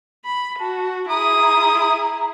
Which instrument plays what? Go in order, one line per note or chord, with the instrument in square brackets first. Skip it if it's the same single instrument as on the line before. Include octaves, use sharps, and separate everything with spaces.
[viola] B5
[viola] F#4 [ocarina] A5
[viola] E4 G#4 [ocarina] A#5 [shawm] D#6